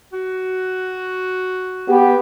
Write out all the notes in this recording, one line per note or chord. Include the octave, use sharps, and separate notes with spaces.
F#4
B3 G4